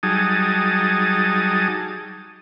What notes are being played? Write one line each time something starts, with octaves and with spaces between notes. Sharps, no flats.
F#3 G3 D#4 G#4 A5 D#6